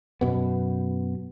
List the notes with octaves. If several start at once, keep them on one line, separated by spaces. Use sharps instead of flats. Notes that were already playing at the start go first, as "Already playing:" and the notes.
F#2 B2 B3